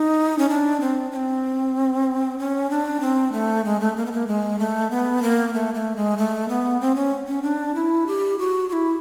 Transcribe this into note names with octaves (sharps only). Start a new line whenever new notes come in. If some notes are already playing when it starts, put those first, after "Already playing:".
Already playing: D#4
C#4
D4
C4
C#4
C4
C#4
D4
C4
A3
G#3
A3
A#3
B3
A#3
G#3
A3
B3
A#3
A3
A3
G#3
A3
B3
C4
C#4
C#4
D4
E4
G4
F#4
F#4
E4